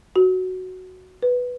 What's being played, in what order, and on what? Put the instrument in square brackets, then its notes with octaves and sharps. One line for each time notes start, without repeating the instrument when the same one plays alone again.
[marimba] F#4
B4